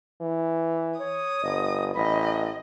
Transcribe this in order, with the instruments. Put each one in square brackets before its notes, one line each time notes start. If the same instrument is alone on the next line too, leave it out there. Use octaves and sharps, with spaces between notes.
[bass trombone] E3
[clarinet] C#5 [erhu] D#6
[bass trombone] G1 [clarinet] D#5
[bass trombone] A1 [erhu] D#5 [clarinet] B5